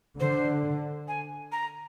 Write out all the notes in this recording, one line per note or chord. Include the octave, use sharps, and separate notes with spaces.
D3 C5
G#5
A#5